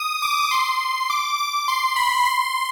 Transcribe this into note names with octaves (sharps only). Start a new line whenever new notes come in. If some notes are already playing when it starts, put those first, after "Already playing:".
Already playing: D#6
D6
C6
D6
D6
C6
B5
C6